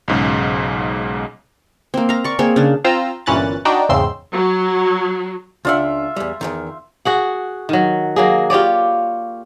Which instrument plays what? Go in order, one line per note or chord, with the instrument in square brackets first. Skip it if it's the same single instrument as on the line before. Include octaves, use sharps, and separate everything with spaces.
[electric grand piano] B1 G#2 C#3
[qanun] A#3 C4
F5 A#5
D5 C#6
A#3 C4 G#4 C#5
C#3 D4
[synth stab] C4 F4 C5 A#5 E6
G1 A#2 E3 C#4 F#6 A6
D4 D#4 F#4 D5 G5 A#5
E2 G#2 C#3 C4 C6 E6
[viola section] F#3
[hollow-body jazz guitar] C#2 D4 F#5 [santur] F4 E5
[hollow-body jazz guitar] E2 G3
E2 G#2 D#3
[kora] F#4 G#4 F#5
D#3 F#3
F#3 A#3 G#4
F4 G4 C#5 D5